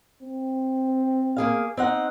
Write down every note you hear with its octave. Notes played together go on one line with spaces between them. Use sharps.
C4
A#3 G#4 F5
C4 D#4 F#5